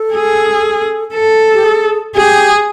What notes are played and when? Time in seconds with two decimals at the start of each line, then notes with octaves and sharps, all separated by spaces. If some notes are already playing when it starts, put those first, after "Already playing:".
Already playing: A4
0.13 G#4
1.14 A4
1.54 G4
1.64 G#4
2.15 G4 G#4